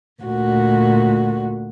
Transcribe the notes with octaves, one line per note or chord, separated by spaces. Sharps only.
D2 A#2 F#4